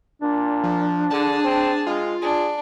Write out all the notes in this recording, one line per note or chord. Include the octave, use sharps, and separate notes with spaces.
A#2 D4
F3
D3 G#4 A5
C4
G#3 F4
D4 G#4